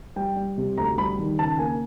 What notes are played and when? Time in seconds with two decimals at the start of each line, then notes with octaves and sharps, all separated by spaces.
0.16 G3 G5
0.36 G3
0.58 C3
0.78 D2 A#5
0.97 G3 B5
1.18 D#3
1.39 C#3 A5
1.59 A#3 G#5